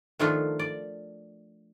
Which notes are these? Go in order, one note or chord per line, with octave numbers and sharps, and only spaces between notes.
D#3 F3 A3 D4 D#4 F4
D5